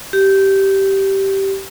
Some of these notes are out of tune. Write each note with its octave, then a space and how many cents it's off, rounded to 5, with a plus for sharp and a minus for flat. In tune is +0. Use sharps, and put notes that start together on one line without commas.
G4 -15